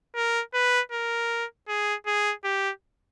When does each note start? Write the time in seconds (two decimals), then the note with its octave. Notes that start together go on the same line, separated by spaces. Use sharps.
0.15 A#4
0.54 B4
0.92 A#4
1.68 G#4
2.06 G#4
2.44 G4